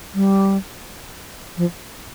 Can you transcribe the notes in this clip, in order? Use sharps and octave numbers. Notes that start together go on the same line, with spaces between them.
G3
F3